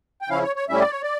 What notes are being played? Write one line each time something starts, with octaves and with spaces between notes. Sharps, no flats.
G5
C#3 F3 C#4 E4 F5
C#5
C#5
A2 G3 C#4 E4 E5
D5
C#5
D5